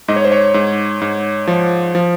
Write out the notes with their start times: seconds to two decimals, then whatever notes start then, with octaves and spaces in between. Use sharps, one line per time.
0.08 G#2 D#5
0.16 C#5
0.24 C5
0.32 C#5
0.54 G#2
1.02 G#2
1.47 F3
1.95 F3